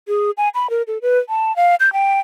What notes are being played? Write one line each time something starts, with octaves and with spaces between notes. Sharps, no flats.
G#4
G#5
B5
A#4
A4
B4
A5
F5
G6
G5